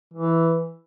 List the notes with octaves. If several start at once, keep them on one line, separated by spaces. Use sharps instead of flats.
E3